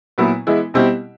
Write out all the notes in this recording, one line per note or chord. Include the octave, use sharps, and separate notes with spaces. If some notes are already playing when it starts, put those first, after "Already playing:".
A#2 F#3 B3 E4
E3 G#3 B3 E4
B2 G3 C4 E4 G4